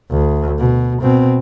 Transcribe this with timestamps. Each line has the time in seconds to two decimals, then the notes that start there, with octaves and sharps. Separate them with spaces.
0.11 D2
0.59 B2
1.02 B2 C4